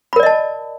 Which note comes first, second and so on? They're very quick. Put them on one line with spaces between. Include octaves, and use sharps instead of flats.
B5 A#4 D5 D#5 A5